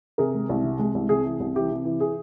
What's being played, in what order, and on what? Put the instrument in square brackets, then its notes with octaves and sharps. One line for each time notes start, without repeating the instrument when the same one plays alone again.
[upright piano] C3 G#4 A#4
G#3
C2
C3
G#3
C2
C3 G#4
E3
C2
E3 G4
C3
E3
G#4